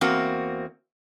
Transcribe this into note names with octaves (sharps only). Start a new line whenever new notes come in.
E2 A#3 C4 F#4